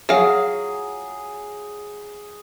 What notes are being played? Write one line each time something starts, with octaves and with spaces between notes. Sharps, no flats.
F#3 G#4 F5